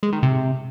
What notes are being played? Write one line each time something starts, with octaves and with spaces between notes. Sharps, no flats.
G#3
D#3
C3